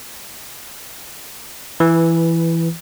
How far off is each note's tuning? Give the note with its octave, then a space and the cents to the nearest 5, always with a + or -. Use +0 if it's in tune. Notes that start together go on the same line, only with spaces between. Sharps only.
E3 +10 B4 -5